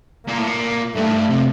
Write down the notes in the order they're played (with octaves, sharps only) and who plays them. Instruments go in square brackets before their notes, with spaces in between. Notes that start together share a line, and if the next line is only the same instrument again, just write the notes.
[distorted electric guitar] A#2 [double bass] A#3
[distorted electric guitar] A2
A#2
[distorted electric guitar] G2 [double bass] A3
[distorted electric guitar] A2
G2
C3